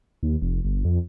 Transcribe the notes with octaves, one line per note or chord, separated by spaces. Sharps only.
D#2
F1
G1
F2